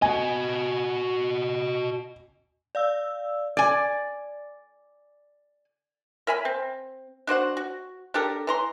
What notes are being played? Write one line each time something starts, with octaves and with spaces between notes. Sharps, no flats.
F#4 D#5 G#5
D5 F5 E6
D5 G#5
A#4 E5 G#5 B5
C4
D4 F#4 C5 F#5
F#4
D4 G4 A4 A#4
E3 A#5 C6